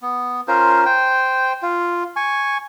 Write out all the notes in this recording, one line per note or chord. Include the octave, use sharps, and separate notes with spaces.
B3
C#4 F4 A#4 C5
C5 G5
F4
G#5 C#6